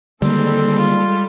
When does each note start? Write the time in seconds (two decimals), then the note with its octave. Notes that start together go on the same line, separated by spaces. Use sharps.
0.22 D3 D#3 G3 G#3 A#3 C4 A4
0.78 F4